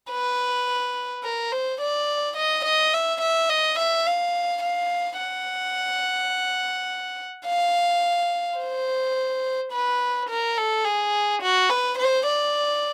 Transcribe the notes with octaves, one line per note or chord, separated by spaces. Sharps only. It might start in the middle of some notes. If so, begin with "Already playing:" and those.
B4
A#4
C5
D5
D#5
D#5
E5
E5
D#5
E5
F5
F5
F#5
F5
C5
B4
A#4
A4
G#4
F#4
B4
C5
D5